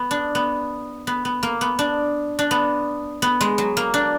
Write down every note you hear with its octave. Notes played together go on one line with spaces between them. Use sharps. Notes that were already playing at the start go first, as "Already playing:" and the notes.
Already playing: B3
D4
B3
B3
B3
A#3
B3
D4
D4
B3
B3
G#3
F#3
A#3
D4